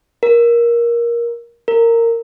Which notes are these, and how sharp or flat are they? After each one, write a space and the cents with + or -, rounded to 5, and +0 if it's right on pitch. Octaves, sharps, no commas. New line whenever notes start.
A#4 +15
A#4 -15